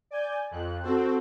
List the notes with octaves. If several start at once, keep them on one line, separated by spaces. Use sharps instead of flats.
D5 G#5 G6
F2 F#6
C4 F#4 A4 C5